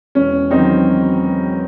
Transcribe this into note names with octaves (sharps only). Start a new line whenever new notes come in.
E1 C#4
E2 D#3 F#3 C4 D#4